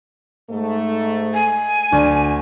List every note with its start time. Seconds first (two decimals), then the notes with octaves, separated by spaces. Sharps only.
0.50 G#2 A3
1.34 G#5
1.92 D2 D4